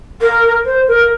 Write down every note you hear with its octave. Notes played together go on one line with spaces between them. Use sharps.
A#4
C5
A#4